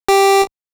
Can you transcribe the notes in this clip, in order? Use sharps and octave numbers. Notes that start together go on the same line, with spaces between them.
G4